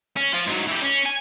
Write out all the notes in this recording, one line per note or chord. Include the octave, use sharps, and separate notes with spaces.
C#4
F3 F4
G#2 F#3
E3 G4
C#4
G#5